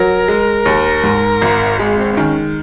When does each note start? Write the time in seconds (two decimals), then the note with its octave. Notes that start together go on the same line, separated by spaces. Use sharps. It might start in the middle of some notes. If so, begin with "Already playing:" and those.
Already playing: F#3 A#4
0.28 G#3
0.65 D#2
1.04 G#2
1.42 G#1
1.79 G#3 G#4
1.98 C4
2.12 C4
2.17 D#3 C#4